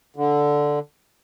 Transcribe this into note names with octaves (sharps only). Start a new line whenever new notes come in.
D3